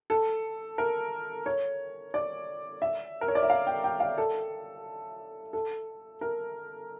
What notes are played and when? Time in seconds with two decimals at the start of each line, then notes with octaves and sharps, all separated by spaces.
0.10 A4
0.78 A#4
1.46 C#5
2.14 D5
2.82 E5
3.21 A#4
3.28 C#5
3.35 D5
3.43 E5
3.50 F5
3.67 G5
3.84 G5
4.00 F5
4.18 A4
5.53 A4
6.21 A#4